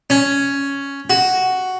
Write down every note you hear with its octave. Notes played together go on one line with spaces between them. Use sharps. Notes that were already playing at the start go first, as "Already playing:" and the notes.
C#4
F#4